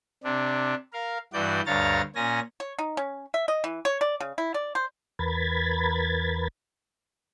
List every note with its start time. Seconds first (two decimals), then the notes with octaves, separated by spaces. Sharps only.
0.24 C3 D4
0.93 A#4 F5
1.33 G2 E3 F#4 D5 G6
1.66 D2 G2 C#5 F5 A#5 A6
2.15 A#2 C#4 G#5 A#6
2.60 C#5
2.78 D#4
2.97 C#4
3.34 E5
3.48 D#5
3.64 E3
3.85 C#5
4.01 D5
4.20 C#3
4.38 E4
4.54 D5
4.75 C5
5.19 E2 A#4 B4 B5 G#6 A6